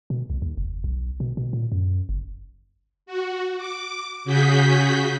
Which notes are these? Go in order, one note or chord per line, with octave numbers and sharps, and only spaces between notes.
B2
C2
D#2
F1
B1
B2
B2
A#2
F#2
F#1
F#4
D6
C#3 F#4 G#4 G6 B6